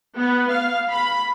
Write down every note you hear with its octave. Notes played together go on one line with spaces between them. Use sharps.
B3
F5
B5